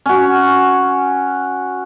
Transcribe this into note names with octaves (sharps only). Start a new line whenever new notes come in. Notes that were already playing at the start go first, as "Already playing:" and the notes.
C#4 F#4